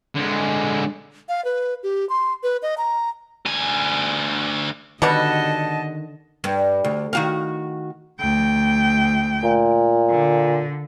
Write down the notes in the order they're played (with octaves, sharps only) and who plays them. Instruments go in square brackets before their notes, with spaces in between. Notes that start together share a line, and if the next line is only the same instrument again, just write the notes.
[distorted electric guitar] D3 G#3
[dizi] F5
B4
G4
C6
B4
D#5
A#5
[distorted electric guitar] D2 G#5
[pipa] B2 G3 F#4 [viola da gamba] D3 D#5 [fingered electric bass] D#3 [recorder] A5
[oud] G2
D2
D#3 F#4 F5
[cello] D2 G5
[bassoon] A#2
[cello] D3